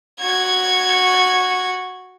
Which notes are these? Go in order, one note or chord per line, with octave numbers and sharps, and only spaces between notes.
F#4 G#6